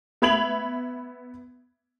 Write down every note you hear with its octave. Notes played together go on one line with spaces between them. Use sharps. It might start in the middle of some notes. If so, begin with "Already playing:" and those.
B3 E5 B5 G#6 F7 F#7